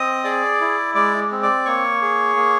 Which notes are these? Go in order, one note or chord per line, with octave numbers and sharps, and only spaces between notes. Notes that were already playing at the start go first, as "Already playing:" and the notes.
Already playing: C4 D#5 D#6
G#4 D5 D6
E4
G#3 D5 D6
C4
D5 D6
A#3 C#5 C#6
G#4
A#3